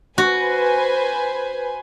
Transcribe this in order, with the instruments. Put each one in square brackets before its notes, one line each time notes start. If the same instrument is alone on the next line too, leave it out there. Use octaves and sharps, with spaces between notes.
[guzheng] F#4 [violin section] B4 C5 G#5